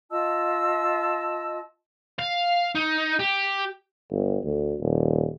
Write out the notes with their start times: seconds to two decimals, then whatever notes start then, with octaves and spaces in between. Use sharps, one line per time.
0.11 F4 D#5 A5 E6
2.19 F5
2.75 D#4
3.19 G4
4.11 G1
4.44 D2
4.80 D#1